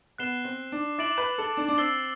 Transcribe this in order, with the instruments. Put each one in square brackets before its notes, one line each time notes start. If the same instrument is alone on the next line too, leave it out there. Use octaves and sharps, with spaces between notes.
[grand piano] B3 [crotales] F#6 C7 E7 G7
[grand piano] C4
D4
[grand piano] E4 [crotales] D6 A6 D7 F#7
[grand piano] B4
A4
D4
D4
[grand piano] C4 [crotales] E6 A6 C7 G7